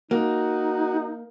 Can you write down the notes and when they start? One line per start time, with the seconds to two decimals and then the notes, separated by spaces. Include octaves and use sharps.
0.11 A#3 D#4 F#4